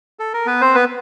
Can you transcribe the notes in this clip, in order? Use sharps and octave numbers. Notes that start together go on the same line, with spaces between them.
A4
A#4
B3 B4
C4 C5
B3 B4